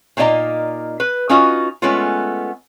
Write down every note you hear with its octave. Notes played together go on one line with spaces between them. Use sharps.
A#2 A#3 D#4 D5 D#5 A#5
B4
C#4 D#4 F4 F#4 D#5
G#3 A3 B3 C#4 F4